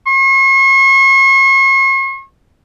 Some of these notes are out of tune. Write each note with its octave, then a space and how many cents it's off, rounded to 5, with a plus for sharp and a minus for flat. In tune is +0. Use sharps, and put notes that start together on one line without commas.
C#6 -45